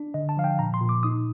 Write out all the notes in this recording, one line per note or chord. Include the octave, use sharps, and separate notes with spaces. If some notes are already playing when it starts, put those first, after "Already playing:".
Already playing: D4
D3 D#5
A5
F3 F5
G5
A#2 A#5
C6
A#2
D6
D#4 D#6